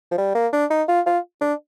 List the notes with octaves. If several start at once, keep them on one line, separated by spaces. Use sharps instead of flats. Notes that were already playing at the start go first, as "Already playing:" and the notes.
F3
G3
A#3
D4
D#4
F4
F4
D4